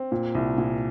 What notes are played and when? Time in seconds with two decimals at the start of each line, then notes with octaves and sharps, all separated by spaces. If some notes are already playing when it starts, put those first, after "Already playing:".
Already playing: C4
0.12 A#2
0.35 C2
0.58 A#2